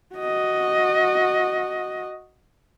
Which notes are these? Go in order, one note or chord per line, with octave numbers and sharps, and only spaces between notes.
F#4 D#5